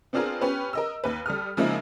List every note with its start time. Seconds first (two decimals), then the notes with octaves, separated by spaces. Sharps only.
0.13 B3 C4 D4 F4 G#4 A#4
0.41 B3 C#4 G4 B4
0.73 A#4 D#5 E6
1.04 D#2 B4
1.26 G3 A4 D#6 F6
1.57 C#3 F3 G#3 A#3 D#4 E4